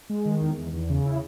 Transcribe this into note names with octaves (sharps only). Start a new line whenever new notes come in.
G#3
D#3
E2
E2
E2
C#3
E4